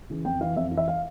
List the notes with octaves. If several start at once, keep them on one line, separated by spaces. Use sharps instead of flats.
C#3 E3
F2 G5
E3 F5
F2 E5
E3
E5
F5